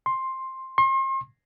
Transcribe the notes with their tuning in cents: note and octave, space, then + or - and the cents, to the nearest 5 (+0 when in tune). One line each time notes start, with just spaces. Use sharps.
C6 +10
C6 +40